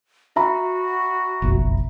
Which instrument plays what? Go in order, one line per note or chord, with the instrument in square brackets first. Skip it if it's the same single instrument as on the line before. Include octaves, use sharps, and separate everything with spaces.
[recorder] F#4 [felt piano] E5 A#5 B5
[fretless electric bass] F#1 B1 F2